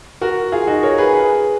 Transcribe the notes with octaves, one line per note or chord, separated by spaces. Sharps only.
F#4 A#4
F4 G#4
D#4 F#4
A#4 C#5
G#4 B4
G#4 B4